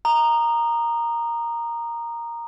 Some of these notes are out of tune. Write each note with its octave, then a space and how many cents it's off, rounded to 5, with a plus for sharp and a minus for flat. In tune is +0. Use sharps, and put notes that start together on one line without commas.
A#5 +0 D#6 -30